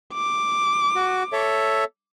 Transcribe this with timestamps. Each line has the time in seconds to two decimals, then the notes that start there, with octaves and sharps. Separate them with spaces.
0.14 D6
0.95 F#4
1.33 A4 C#5 E5